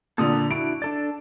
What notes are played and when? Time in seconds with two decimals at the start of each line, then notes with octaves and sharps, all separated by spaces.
0.18 A#2 D3 A4 D#6
0.51 D4 E4 F#4 D7
0.82 D4 A4 D5